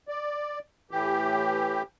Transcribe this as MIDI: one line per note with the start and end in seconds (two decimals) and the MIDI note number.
0.08 0.59 74
0.91 1.82 45
0.91 1.82 52
0.91 1.82 67